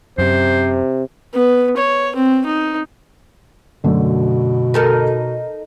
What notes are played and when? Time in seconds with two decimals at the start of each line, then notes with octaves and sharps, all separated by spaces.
0.18 F#2 C3 C5
1.34 B3
1.77 C#5
2.16 C4
2.46 D#4
3.84 F#2 B2 D3 A3
4.74 D#4 A4 A#4